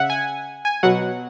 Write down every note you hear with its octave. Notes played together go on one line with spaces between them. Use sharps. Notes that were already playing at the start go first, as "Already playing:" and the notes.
Already playing: C#3 E5 F#5
G#5
G#5
B2 F#3 F#5